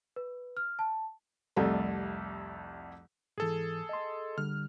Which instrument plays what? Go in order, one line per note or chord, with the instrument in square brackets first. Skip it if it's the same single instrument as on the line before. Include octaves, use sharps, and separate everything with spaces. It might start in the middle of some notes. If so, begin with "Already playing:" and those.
[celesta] B4
F6
A5
[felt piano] C2 F2 G3 A3
[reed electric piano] G#2 E3 [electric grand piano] G#4 A4
[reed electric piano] D#5 C6
[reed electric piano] D3 G3 [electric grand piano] F6